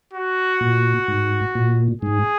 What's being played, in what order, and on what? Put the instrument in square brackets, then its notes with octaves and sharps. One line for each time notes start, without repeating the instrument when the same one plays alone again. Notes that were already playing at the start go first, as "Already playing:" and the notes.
[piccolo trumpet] F#4
[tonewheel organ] A#2
G#2
A#2
[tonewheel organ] G#2 [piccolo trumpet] G#4